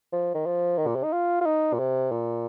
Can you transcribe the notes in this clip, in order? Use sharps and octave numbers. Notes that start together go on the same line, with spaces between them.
F3
D#3
F3
D#3
A#2
C3
D#4
F4
F4
D#4
A#2
C3
A#2